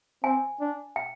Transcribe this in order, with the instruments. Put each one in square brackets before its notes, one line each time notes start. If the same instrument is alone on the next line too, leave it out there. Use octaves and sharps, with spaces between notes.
[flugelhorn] C4 [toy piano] G#5
[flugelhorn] D4
[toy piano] G5